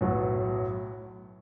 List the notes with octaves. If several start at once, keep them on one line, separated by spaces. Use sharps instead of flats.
B1 A2 F#3 B3